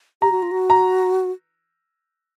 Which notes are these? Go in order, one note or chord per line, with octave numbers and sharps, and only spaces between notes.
G4 A#5
F#4
F4
F#4
A#5